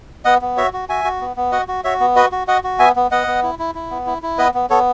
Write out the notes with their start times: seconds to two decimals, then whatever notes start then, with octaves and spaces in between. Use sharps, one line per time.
0.25 B3 D#5 F#5
0.42 B3
0.57 F#4 C#5 E5
0.73 F#4
0.89 F#4 E5 G#5
1.05 F#4
1.21 B3
1.37 B3
1.52 F#4 D#5 F#5
1.68 F#4
1.84 F#4 C#5 E5
2.00 B3
2.16 F#4 B4 D#5
2.32 F#4
2.47 F#4 D#5 F#5
2.64 F#4
2.79 B3 E5 G#5
2.96 B3
3.11 B3 D#5 F#5
3.27 B3
3.43 E4
3.59 E4
3.75 E4
3.91 B3
4.06 E4
4.22 E4
4.38 B3 B4 D#5
4.54 B3
4.70 B3 A4 C#5